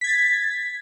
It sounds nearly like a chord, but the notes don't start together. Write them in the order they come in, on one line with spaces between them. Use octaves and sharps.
B6 G#6 A6